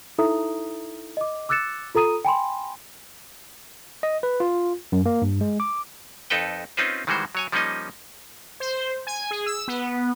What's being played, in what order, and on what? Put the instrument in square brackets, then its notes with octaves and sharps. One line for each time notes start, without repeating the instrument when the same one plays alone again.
[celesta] D#4 E4 A4 E5 A#5 D#6
D#5 D6
D6 E6 F#6 A6 C#7 E7
F4 A4 A#5 D#6 D#7
G5 G#5 B5 C6
[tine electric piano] D#5
B4
F4
F#2
A#3
G2
G#3
D6
[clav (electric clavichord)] F2 D#4 A4 B4 G5
C4 C#4 D#4 F4 B4 C5
D#3 E3 G3 G#3 F#4 C5
F#3 C#5 G#5
F3 G3 A#3 C#4 D#4 D#5
[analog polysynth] C5
G#5
G#4
E6
B3